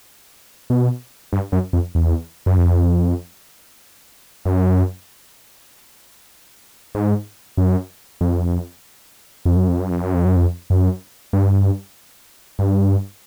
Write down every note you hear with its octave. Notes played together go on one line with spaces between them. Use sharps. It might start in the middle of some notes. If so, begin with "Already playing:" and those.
B2
G2
F#2
F2
E2
F#2
F2
F#2
G#2
F#2
F2
F2
F#2
F2
F#2
F2
F#2
F2
F#2
F2
F#2
G2
G2